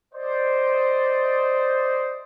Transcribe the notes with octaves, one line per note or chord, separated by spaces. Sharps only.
C5 D5 D#5